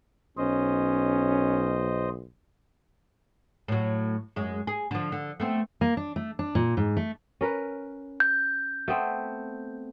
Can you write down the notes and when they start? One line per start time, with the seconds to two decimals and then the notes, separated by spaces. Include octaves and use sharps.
0.37 B1 C#4 C5 D#5
3.68 A2 F#3
4.36 F#2 G#3
4.67 G#4
4.91 D3 F3
5.12 D3
5.40 A3 B3 C4
5.81 A#3
5.97 D4
6.16 A3
6.39 D4
6.55 A#2
6.77 G#2
6.97 A3
7.41 C#4 A#4 B4
8.20 G6
8.88 A3 B3 C4